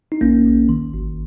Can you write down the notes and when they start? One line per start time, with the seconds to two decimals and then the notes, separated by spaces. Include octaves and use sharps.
0.12 D#4
0.21 A#1 A#3 C#4
0.45 A#1
0.69 D#3
0.94 G#1